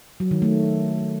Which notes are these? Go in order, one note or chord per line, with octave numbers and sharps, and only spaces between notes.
F#3
D#3
A3